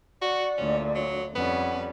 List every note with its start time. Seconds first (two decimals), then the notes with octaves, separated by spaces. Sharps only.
0.22 F#4 D5 F#5 C#6
0.58 D2 A#2 C#4
0.95 F#3
1.36 F2 G3 B3 C#4 F#5